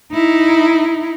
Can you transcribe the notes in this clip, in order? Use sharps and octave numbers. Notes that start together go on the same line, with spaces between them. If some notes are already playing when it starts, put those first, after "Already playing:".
D#4 E4